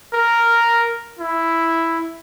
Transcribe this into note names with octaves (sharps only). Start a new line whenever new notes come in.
A#4
E4